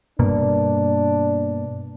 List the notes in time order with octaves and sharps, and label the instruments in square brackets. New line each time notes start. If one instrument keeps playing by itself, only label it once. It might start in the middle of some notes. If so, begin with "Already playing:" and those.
[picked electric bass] G2 B2 A#3 [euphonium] D4